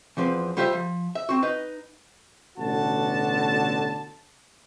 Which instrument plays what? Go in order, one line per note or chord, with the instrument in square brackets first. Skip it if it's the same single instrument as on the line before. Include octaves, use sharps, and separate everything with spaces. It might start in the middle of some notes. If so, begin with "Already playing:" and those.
[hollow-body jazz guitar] E2 F3 C4 B4
G3 F4 G4 C5 D#5 E5
F3
E5
C4 F#4
D#4 B4 D#5
[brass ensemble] A1 B2 D3 F#4 A5